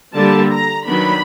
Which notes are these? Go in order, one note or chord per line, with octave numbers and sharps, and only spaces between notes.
D3 G3 A#3 A5
A#5
D#3 F#3 B3 D4 B5